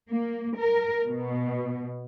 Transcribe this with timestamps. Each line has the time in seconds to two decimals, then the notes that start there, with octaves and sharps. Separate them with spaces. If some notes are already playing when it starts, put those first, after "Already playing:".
0.10 A#3
0.58 A#4
1.05 B2